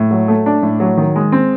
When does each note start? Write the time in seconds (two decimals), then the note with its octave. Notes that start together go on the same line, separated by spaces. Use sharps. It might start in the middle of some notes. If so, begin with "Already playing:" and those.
Already playing: A2
0.11 F#3
0.28 A3
0.46 D4
0.63 A2
0.80 F#3
0.97 D#3
1.16 G#3
1.32 C4